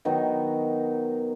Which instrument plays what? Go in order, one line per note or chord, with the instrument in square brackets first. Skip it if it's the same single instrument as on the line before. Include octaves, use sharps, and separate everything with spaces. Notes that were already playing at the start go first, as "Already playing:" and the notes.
[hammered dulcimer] D#3 F#3 B3 D#4